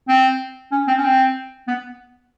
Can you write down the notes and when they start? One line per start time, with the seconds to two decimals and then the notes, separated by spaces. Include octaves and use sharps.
0.08 C4
0.72 C#4
0.88 C4
0.98 C#4
1.04 C4
1.68 B3